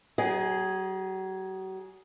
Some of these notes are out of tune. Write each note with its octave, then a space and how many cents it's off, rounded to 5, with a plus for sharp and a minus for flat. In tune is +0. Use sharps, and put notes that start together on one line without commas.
F#3 +40 G#4 +0